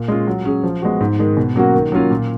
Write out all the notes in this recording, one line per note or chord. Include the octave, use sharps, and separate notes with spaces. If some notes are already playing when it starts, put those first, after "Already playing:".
Already playing: A#2
G#3 C#4 F4
F#3
C#4 G#4
F3
G#3 B3 F#4
G#2
D#3 G#3
B2
F#3 A#3 C#4 F#4
D#3
F#3 A#3 C#4 F4
A#2